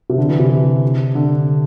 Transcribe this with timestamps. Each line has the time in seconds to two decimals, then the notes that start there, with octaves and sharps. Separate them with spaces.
0.10 C3
0.18 D3
0.28 E3
0.39 C3
1.15 D3